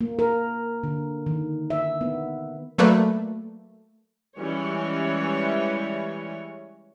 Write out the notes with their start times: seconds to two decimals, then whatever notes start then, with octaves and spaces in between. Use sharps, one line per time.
0.01 A#3
0.19 A#4
0.83 D3
1.26 D#3
1.70 E5
2.01 B3
2.78 F#3 A3 A#3 B4 D5
4.39 E3 G3 G#3 C#4 C#5